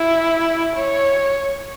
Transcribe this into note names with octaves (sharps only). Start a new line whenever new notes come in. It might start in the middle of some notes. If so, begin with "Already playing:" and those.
Already playing: E4
C#5